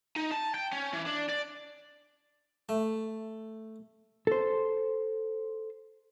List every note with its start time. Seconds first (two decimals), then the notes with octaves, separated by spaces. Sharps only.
0.16 D#4
0.31 A5
0.54 G5
0.73 C#4
0.94 E3
1.06 D4
1.29 D5
2.69 A3
4.27 A4 C5